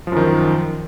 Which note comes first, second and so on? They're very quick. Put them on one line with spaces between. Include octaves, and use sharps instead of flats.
F3 F#2 D#3